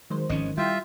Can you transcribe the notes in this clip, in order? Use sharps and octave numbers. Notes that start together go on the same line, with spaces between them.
D#3 F#3 G#3 C5
G#1 F3 C#4 D#5
G3 E4 F4 E5 G5